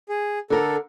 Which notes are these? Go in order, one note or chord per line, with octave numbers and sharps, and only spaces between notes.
G#4
D3 A4 A#4